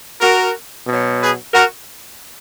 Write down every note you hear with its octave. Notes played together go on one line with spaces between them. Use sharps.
F#4 A#4
B2 F#3
G#4 B4
F#4 A#4